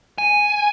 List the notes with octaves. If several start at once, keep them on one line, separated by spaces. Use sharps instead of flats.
G#5